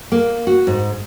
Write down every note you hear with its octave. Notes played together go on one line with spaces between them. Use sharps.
A#3
F#4
G#2